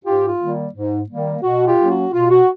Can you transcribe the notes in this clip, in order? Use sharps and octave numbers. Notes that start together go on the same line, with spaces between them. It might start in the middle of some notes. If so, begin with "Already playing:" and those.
G#2 F4 G4
F4
D#3 G3 A#3
G#2
D#3 G3 A#3
B2 F#4
F4 G4
F#3 A#3 C#4
F#4
B2 F4
F#4